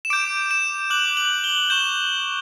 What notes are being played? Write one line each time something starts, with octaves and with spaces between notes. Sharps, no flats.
E7
D6 G6 D7
E7
D6 F#6 F#7
F#7
G7
C#6 G6 E7